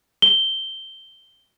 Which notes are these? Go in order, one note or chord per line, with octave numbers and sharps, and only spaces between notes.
G7